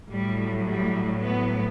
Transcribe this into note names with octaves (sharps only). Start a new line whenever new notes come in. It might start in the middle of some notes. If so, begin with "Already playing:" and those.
A2 F#3 G3
G3
B3